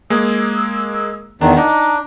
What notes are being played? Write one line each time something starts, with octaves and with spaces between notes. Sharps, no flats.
G#3 A#3 G#4 E6
E2 D#3 D4 A#5
D4 D#4